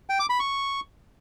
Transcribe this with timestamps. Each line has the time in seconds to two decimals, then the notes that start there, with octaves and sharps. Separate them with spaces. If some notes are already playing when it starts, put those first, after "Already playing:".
0.10 G5
0.20 D6
0.30 B5
0.40 C#6